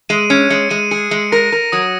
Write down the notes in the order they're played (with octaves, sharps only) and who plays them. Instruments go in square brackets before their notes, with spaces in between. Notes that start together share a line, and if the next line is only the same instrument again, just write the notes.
[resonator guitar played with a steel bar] G#3 [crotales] D#7
[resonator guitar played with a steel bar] C#4 [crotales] C#7
[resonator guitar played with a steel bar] G#3 [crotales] C#7
[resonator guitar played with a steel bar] G#3 [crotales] D#7
[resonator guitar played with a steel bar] G#4 [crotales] C#7
[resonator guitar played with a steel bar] G#3 [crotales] C#7
[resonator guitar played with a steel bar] A#4 [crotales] A#6
[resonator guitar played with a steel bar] A#4
[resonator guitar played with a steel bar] F#3 [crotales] D#6